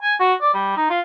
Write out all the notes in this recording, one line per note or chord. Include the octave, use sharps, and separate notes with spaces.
G#5
F#4
D5
G3
D#4
F4